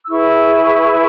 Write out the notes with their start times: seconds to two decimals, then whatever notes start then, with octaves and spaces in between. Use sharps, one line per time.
0.05 E6
0.09 E4 G#4 B4 C#6
0.82 C#6